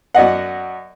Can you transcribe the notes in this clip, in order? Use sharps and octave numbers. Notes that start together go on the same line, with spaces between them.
F#2 D5 D#5 F#5